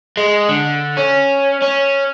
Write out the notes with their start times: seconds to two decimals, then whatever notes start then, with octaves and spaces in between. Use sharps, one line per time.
0.17 G#3
0.49 D3
0.97 C#4
1.62 C#4